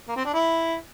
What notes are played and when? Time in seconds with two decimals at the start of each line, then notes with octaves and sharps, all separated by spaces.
0.08 A#3
0.16 C4
0.25 D4
0.34 E4